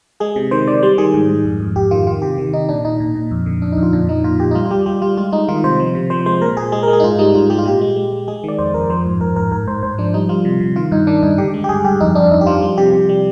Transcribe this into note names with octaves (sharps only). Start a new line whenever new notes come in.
G#3 G#4
C3
D#3 C5
D#3 D5
G3 C5
D#3 G#4
G#2
G#2
F2
F2
F2 G4
D#3 F4
D#3 F4
C3 G4
D#3
C3 D#4
A#2 D4
A#2 D#4
A#2
A#2
F2
D3
F2 D4
D#4
F2
F4
A#2 D4
F3 D#4
A#2 F4
A#2 G4
D#4
G3 F4
F4
G3 G4
G3 G4
G3 F4
G#3 F4
G#3 D#4
D#3 F4
C3 C5
F3
C3
F3 C5
G#3 C5
A#2 A#4
A#2 G#4
G#3 G#4
A#4
G#3
G#4
D#4
G#2 F4
G3 D#4
G#2 F4
G3 G4
F4
A#2 G4
G#3
G#3
G#3
G#3 G#4
D#3 D5
F2 C5
F2 A#4
F3 C5
G#2
G#2 A#4
G#2 A#4
G#2 A#4
G#2 C5
G#2 C5
F3 D4
G3 D#4
G3 F4
C3
C3
D#3 F4
G2 D#4
D#3 D4
G2 D#4
D3 G4
G#3
G4
G2 G#4
G2 G4
F2 D#4
F2 D4
F2 D#4
G4
F3 F4
G3
C3 G4
C3
G3